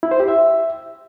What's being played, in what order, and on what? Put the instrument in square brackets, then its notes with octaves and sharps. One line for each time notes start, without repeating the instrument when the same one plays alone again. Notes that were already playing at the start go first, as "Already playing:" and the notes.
[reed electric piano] E4
C5
G4
E5